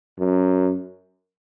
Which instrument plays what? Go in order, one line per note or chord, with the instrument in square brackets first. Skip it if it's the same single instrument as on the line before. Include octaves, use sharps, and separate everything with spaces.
[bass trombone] F#2